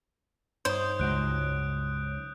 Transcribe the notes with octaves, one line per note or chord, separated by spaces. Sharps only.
G2 D#4 C5 C#5 D#6 G6
C#2 F#3 G#3 F#6 D7